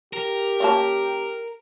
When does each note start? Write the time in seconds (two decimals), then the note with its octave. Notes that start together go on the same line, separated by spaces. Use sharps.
0.13 G4 A#4
0.60 C#3 A#3 A5